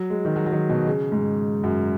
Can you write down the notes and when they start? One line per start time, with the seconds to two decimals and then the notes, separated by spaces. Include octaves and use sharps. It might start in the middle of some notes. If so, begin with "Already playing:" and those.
Already playing: F#3
0.10 G#3
0.25 D#3
0.36 F#3
0.46 F#3
0.53 D#3
0.70 B2
0.87 C#3
1.12 G#2
1.63 F#2